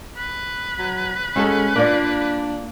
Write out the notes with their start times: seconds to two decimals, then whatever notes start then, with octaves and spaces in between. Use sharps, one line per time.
0.17 B4
0.78 F#3
1.36 G#3 C#4 F#4 A4
1.76 A#3 D4 F4 D5